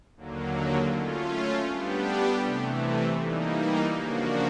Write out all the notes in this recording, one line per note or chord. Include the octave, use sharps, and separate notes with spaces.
D#2 D3 F#3 A#3
A3 C#4 F4
G3 B3 D4 G4
C3 E3 A3
E3 G3 A#3 D#4
C#3 F3 A#3 D4 F#4